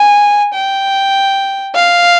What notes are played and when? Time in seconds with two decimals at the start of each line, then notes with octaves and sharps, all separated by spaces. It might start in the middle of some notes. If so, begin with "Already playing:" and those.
Already playing: G#5
0.54 G5
1.75 F5